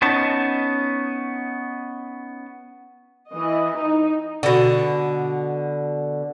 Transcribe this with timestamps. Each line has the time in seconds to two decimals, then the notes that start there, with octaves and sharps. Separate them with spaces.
0.02 B3 C#4 D#4 A5
3.30 E3 D#5
3.77 D#4
4.43 B2 D3